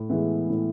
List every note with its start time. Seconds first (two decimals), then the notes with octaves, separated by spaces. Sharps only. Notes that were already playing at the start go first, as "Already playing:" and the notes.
Already playing: A2
0.09 E3 G#3 B3 E4
0.50 A2